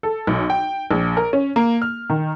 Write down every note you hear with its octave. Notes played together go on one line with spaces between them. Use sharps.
A4
B1
G5
A#1
A#4
C#4
A#3
F6
D#3